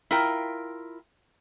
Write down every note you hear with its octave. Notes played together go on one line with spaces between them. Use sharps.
E4 F4 A#4 G5